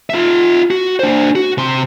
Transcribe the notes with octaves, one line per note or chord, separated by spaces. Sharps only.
F4 E5
F#4
D4 C5
F#4
C3 C6